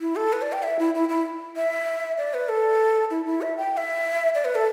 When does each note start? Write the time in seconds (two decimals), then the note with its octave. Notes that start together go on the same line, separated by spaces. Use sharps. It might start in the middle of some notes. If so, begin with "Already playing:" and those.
0.01 E4
0.16 A4
0.33 B4
0.42 D5
0.53 G5
0.63 E5
0.79 E4
0.95 E4
1.09 E4
1.57 E5
2.18 D5
2.34 B4
2.49 A4
3.11 E4
3.26 E4
3.42 E5
3.57 G5
3.73 G5
3.77 E5
4.35 D5
4.45 B4
4.55 A4